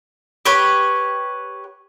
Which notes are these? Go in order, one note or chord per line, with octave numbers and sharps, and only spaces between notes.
G4 B4 C#5